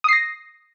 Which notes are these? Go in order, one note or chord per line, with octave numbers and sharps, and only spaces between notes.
D#6 A#6 C7